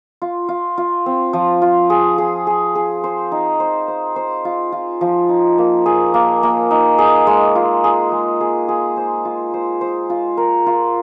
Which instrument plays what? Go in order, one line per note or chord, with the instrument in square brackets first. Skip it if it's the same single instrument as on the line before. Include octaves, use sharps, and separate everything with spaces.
[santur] F4
F4
F4
C4
F3
F4
G#4
G#4
G#4
G#4
C5
D#4
C5
C5
C5
F4
F4
F3
D#4
A#3
G#4
A#3
A#3
D#4
G#4
G#3
F4
G#4
G#3
G#4
G#4
C5
F4
C5
C5
F4
A#4
F4